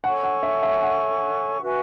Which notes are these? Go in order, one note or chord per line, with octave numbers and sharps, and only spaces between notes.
A4 C#5 F#5 G#5 C#6
F#5
E5
E5
F#5
F#4 B4 E5 G#5